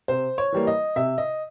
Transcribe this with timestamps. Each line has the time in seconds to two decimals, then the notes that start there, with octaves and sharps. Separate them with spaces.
0.08 C3 C5
0.38 C#5
0.52 E3 G3 A#3
0.67 D#5
0.96 C3 E5
1.18 D#5